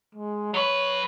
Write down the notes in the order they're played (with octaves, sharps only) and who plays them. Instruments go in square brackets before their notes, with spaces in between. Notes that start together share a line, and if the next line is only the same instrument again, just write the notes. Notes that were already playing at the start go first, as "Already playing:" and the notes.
[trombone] G#3
[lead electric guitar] F#3 B4 [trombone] C#5